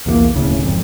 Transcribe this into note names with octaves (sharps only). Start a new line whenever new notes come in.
B1 E2 E3 A#3
D1 A2 C#3
G#1 F2